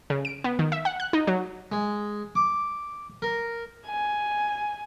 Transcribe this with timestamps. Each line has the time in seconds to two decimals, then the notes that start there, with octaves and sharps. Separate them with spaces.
0.10 C#3
0.25 D7
0.44 B3
0.59 D#3
0.72 E5
0.85 F#5
1.00 F#6
1.13 D#4
1.27 F#3
1.72 G#3
2.35 D6
3.22 A#4
3.86 G#5